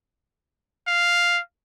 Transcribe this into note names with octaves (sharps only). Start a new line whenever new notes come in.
F5